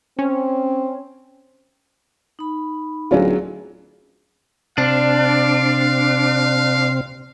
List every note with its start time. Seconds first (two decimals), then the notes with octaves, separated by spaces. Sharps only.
0.19 C4 C#4
2.39 D#4 B5
3.11 D1 F#3 C#4 F4 G#4
4.78 C3 C4 D4 F5